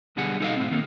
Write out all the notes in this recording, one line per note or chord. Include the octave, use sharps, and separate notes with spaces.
B1 B2 D3 G3 G#4 F#5
D#4 E4 A4 A#4 D#5 F5
A2 C4
D#3 A#3 D4 D#4